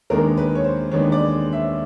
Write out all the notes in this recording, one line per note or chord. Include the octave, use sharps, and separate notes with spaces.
D#2 D#3 G#3 B3 D4 A#4
B4
C#5
C5
D#2 D#3 G#3 B3 D4 C#5
D5
E5